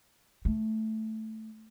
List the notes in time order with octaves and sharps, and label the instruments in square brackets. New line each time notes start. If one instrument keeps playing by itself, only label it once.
[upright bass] A3